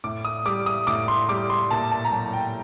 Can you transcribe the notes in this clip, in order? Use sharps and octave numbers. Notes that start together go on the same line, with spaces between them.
A2 D6
D#6
G3 D6
D#6
A2 D6
C6
G3 D6
C6
A#2 A5
A5
A#5
F#3 A5
G5